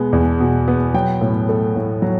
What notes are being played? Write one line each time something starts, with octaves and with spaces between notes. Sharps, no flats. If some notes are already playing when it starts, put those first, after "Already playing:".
Already playing: B2 G#3 B3
E2
B2
B3
F#3 G5
A2
A3
A2
F#3